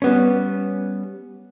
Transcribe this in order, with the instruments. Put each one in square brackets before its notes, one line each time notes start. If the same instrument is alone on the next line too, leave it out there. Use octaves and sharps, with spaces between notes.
[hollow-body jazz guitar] G3 B3 C#4